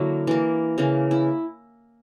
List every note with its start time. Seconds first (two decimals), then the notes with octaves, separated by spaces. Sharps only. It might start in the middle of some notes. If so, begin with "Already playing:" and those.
Already playing: D3 F#3 A#3 D4 E4
0.27 E3 A#3
0.78 C#3 E3 A#3
1.11 E4